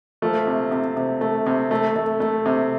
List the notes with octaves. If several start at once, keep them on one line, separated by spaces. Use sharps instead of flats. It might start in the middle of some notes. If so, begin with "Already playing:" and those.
F3 A3
C3
C3
C3
A3
C3
A3
A3
A3
C3